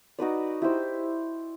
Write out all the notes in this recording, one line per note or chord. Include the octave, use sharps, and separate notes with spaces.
D#4 F#4 B4 D5
E4 G4 C5